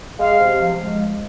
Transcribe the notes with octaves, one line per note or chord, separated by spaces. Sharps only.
G#3 F5
C3
F3
G#3